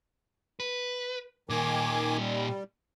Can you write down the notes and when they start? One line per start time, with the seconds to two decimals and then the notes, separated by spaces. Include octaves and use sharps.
0.60 B4
1.49 A#2 D#3 D#4 G#5 D6
2.18 G3